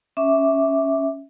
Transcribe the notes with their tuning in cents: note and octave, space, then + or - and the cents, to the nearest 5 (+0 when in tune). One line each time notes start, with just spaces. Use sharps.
C#4 +0 E5 -10 D6 +0